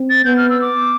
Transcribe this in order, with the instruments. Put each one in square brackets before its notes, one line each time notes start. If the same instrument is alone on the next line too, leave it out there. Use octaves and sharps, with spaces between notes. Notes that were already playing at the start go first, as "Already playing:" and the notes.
Already playing: [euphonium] C4
[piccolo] A6
[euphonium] B3 [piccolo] G6
[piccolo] F6
E6
D6